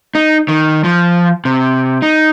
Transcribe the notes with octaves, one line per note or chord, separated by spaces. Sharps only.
D#4
D#3
F3
C3
D#4